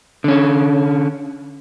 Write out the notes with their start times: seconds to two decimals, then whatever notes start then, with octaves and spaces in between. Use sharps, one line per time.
0.24 D3 C#4